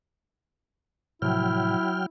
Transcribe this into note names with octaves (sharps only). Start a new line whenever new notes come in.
A2 C3 F3 F#3 E4 G5 F6